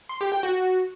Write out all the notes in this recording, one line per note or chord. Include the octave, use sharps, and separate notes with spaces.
C6
G4
G5
F#4